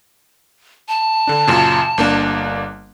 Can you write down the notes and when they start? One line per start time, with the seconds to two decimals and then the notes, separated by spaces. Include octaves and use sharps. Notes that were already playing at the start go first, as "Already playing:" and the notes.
0.89 A5
1.27 D3 D4
1.47 F#2 A#2 C#3
1.98 G1 A#3 D4